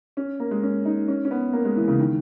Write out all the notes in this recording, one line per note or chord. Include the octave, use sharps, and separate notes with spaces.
C#4
A#3
G#3
C#4
D#4
C#4
C#4
B3
A#3
G#3
E3
C#3
D#3